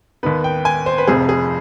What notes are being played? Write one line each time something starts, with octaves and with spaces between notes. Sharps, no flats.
D#2 D#3 B3 B4
G5
G#5
C5
B4
F1 F2 C3 F3 C4 G#4
G#4